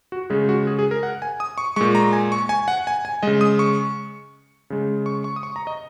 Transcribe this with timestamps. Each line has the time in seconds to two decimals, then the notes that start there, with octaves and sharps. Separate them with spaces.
0.12 F#4
0.30 C#3 G#3 G#4
0.49 F#4
0.67 G#4
0.79 G#4
0.91 A#4
1.03 F#5
1.22 G#5
1.40 D#6
1.58 C#6
1.76 A#2 G#3 C#6
1.95 A#5
2.13 G#5
2.32 C#6
2.49 G#5
2.68 F#5
2.87 G#5
3.05 G#5
3.23 C#3 G#3 D#5
3.41 D#6
3.59 C#6
4.70 C#3 G#3
5.06 C#6
5.24 C#6
5.36 D#6
5.43 C#6
5.56 A#5
5.67 D#5